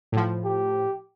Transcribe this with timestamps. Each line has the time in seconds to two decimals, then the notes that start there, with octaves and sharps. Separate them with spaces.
0.12 A2 F3
0.45 G4